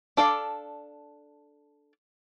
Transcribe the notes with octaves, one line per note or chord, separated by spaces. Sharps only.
D4 A4 D5 F5